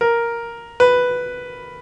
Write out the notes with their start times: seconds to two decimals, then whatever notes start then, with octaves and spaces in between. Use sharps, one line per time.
0.01 A#4
0.80 B4